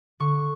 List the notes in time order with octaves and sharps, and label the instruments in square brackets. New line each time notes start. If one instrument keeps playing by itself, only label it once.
[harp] D3 C#6